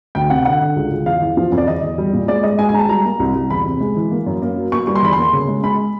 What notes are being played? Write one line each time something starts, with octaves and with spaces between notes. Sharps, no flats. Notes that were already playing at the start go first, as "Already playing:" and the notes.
D2 G5
C3 F#5
D3 F#5
D3
C#2
C#2
E2 F5
E3
F3
F2
D5
E2 D#5
E2
G3
A#2
G#3 D5
G#2 D#5
G#3 G#5
G#5
G#3 A#5
A5
G3 A#5
A#3
C2
C2
E2 B5
C3
G#3
E3
A#3
F#2
A#3
F#3
A#3 C#6
G3 C#6
C6
E2 B5
A#3 C6
C#3
G#3
G#3 B5